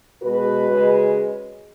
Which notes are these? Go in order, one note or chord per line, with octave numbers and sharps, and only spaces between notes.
B2 G#3 F#4 B4
C#3 G#3